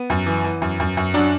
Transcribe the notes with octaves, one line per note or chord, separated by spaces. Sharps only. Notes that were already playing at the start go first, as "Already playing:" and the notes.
Already playing: B3
F#2
E3
E3
F#2
F#2
F#2
F#3 D4